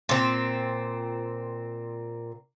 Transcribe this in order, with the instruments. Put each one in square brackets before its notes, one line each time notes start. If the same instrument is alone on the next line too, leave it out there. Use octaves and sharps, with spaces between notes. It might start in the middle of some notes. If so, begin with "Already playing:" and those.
[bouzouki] A#2 C4